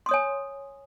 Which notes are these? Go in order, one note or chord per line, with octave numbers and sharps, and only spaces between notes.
C#5 G#5 C6 D#6